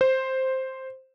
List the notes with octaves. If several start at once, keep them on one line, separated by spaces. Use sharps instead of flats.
C5